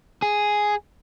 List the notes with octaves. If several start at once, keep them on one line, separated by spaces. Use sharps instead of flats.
G#4